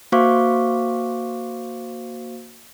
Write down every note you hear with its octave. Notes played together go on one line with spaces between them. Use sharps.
A#3 F#4 C5 F5 C#6 D6